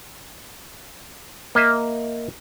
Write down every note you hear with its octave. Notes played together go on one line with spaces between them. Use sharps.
A#3 D#5 E5